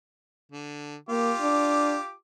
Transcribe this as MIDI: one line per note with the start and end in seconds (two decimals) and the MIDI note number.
0.52 0.96 50
1.09 1.32 58
1.09 2.13 65
1.09 2.13 67
1.09 2.13 86
1.41 1.97 62